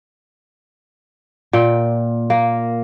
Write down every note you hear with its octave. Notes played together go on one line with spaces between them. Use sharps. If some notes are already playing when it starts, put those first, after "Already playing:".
A#2 G5
A#3